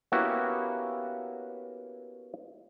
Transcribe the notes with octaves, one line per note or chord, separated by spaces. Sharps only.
A#3 B3 C#4 E4 F#4 G4